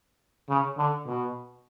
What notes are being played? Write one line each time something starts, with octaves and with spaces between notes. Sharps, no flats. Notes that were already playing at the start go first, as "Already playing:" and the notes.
C#3
D3
B2